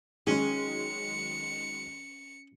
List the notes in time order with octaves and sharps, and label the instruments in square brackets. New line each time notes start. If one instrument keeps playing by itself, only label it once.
[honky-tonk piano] D#3 F#3 G#3 [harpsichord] C#4 [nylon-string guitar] G#4 [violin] C#7